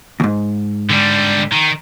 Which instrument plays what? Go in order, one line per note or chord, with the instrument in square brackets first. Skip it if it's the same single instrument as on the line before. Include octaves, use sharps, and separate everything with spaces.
[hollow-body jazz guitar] D2 G#2
[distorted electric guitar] D3 G3
D#3